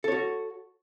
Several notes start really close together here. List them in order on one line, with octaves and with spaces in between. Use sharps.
A4 C#5 F#4